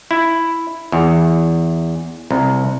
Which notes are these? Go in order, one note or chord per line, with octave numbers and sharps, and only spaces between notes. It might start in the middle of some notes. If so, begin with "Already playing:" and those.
E4
E2
C2